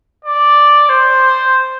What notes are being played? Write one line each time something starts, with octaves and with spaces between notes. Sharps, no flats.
D5
C5